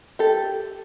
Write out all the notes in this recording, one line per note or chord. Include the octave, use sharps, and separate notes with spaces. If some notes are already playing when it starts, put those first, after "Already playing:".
G4 A4